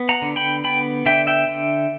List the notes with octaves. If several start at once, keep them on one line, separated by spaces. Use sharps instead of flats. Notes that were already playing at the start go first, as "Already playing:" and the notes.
Already playing: B3
F#5 A#5
D3
G5 B5
B3 G5 B5
D3 E5 G5
E5 G5
D3